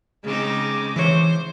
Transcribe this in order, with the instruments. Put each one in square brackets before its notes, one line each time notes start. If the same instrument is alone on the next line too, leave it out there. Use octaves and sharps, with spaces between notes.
[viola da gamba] C#3 C4 D#4 [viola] G#3 D6
[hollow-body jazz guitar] E3 C#5 [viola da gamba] C5